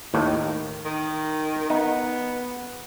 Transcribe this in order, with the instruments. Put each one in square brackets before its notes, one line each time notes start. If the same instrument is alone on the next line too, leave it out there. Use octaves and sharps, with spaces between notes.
[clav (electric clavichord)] D#2 A2 [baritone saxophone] D#3
[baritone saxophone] D#3
[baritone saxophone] B3 [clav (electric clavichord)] D#4